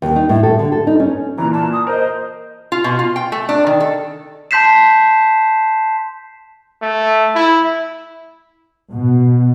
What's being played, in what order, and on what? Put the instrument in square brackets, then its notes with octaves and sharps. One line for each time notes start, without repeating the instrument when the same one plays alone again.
[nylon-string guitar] D#2
D#4
A2
A4
D3
A4
D#4
C#4
[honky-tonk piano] A#2 E3 [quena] A#5
[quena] A5
D#6
[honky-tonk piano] A#4 D#5 [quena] C5
[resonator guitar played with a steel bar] F4
B2
F4
G5
A3
D4
D#3
A4
[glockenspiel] A5 C6 G6 B6 C7 E7
[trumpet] A3
E4
[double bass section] B2